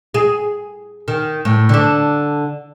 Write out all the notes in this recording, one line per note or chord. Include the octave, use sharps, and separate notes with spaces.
G#4
D#3
A2
D3 D4